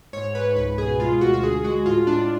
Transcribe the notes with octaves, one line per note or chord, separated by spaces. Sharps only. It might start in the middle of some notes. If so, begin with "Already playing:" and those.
G#2 C#5
G#2 B4
C#2 B4
B2 G#4
G#3 F4
D2 F#4
F#4
D2 G#4
G#3 F#4
A2 F4
A2 D4